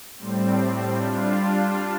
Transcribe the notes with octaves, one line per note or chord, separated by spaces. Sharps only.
A2 G3 C4
G3 D4 F4